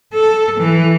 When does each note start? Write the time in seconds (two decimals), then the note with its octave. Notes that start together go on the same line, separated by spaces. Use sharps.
0.14 A4
0.61 E3